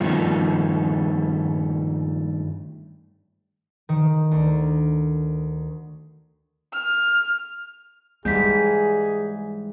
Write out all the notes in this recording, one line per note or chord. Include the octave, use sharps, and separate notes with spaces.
G2 A#2 D#3 F3 A3
D#3
D2
F6
G#2 E3 G3 G#3 G#4 G6 B6